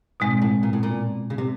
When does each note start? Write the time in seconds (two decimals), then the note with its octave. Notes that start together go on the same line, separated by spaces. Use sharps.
0.20 G#2 B2 G#3 C4
0.42 A2
0.63 A#2
0.73 A2
0.83 A#2
1.30 C#3
1.38 C3